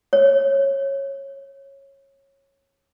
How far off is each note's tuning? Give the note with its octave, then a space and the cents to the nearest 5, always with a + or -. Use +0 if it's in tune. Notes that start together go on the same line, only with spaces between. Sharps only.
C#5 -15